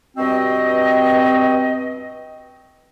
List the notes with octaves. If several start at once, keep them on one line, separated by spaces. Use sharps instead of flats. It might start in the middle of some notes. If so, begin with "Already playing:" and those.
G2 B2 C4 F#4 D#5